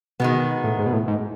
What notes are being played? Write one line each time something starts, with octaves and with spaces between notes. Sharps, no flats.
B2 D#3 G#3 B3
A2
G#2
B2
A2
G#2